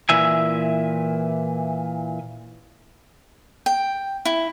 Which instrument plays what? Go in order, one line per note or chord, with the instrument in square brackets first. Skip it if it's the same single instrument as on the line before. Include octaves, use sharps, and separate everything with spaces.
[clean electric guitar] A#2 E3 E5 G#5
[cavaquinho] G5
E4